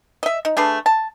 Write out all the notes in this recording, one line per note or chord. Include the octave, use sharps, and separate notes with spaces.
D#5 E5
D#4
A3 D4 G#4 B4
A5